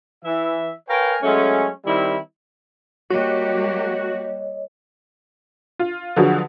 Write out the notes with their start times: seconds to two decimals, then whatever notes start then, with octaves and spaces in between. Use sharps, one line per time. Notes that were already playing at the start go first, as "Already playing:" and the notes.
0.24 E3 E5
0.89 A#4 B4 C#5 F5 G5 G#5
1.23 F#3 G#3 A3 C#4
1.86 D#3 G3 C4 E4
3.10 G3 A#3 F#4 G4 C#5 D#5
5.79 F4
6.16 D3 F3 F#3 F#4 G#4 B4